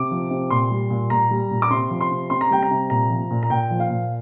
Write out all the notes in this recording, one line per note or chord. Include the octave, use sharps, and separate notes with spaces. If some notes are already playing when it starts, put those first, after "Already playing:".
Already playing: C3 D6
F3
C3
A#2 C6
G3
A#2
A#2 A#5
G3
A#2
D6
C3 C6
F3
C6
C3
C3 C6
A#5
G3 G5
A#5
C3
A#2 A#5
F3
A#2
A#5
A#2 G5
F3
F5
A#2